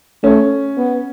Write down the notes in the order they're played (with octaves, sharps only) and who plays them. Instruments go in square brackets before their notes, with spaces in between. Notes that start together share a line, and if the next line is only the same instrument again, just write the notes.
[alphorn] A3 [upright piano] C#4
[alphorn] B3